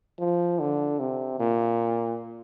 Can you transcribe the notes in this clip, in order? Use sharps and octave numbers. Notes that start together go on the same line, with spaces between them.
F3
D3
C3
A#2